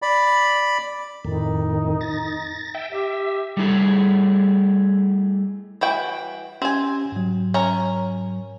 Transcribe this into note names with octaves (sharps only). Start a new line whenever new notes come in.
D5 B5
F2 A2 D#3 D#4
A6 A#6
E5 G5
G4 E5
G3 A3 E4 G#4
E3 F#4 G5
C4 C#4 G4 G#5
G#2 F#3
C#4 A#4